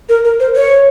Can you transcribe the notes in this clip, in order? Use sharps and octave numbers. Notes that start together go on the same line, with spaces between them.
A#4
A#4
C5
C#5